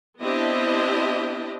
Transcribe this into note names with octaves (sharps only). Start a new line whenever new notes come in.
B3 C4 D4 E4 G4 D#5